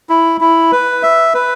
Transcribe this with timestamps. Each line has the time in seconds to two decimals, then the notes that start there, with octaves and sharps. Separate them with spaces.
0.09 E4
0.41 E4
0.72 B4
1.03 E5
1.34 B4